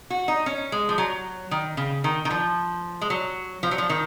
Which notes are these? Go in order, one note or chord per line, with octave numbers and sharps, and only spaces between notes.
F#4
D#4
C#4
G#3
F3
F#3
D#3
C#3
D#3
D#3
F3
G#3
F#3
F3
F#3
F3
D#3